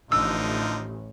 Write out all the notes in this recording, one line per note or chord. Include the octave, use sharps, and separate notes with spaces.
A1 D3 F3 D#4 E6